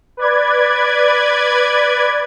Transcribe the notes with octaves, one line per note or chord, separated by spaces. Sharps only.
B4 D5 G#6